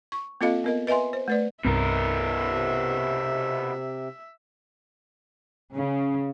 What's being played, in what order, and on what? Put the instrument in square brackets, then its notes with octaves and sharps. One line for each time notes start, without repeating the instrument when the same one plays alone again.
[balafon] C#6
A#3 C4 F4 A4 D#5 F5
B3 A#4 D#5
B4 D#5 E5 G#5 C6
C5
A3 B4 D5
[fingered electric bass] C2 G2 C4 [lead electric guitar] B2 A#4 [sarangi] E5
[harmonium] C3
[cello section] C#3